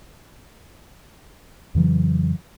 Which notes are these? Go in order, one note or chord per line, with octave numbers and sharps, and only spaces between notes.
F2 C#3 E3 F#3